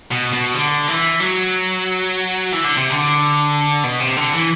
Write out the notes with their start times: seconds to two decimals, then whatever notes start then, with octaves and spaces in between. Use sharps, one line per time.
0.11 B2
0.33 B2
0.54 D3
0.88 E3
1.20 F#3
2.52 E3
2.64 D3
2.77 C3
2.90 D3
3.84 B2
4.00 C3
4.16 D3
4.33 E3